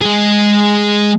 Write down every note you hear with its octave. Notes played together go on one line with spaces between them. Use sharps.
G#3 G#4